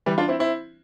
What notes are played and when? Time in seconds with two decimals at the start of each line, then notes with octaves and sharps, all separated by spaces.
0.06 E3 G3
0.18 D4 F4
0.28 C4 E4
0.39 C4 E4